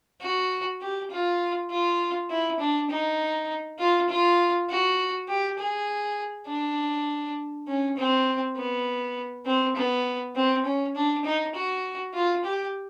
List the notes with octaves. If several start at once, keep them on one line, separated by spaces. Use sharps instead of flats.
F#4
G4
F4
F4
E4
D4
D#4
F4
F4
F#4
G4
G#4
D4
C#4
C4
B3
C4
B3
C4
C#4
D4
D#4
F#4
F4
G4